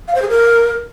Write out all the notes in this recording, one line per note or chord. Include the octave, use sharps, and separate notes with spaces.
F5
C5
G#4
A#4